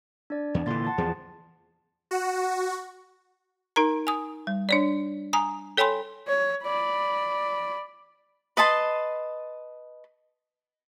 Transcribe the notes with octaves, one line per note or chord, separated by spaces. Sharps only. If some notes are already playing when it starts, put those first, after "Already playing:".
D4 D5
E2
A#2 D3 E3 C6 A6
F#5 A5 A6
E2 F3 G#4
F#4
D#4 A#4 A#5
G#5 D#6
G3
D4 C#5 D5
G#5 A#5 D#6
A4 C#5 G5 G#5 B5 C6
C#5
D5 B5
B4 D#5 A5 C6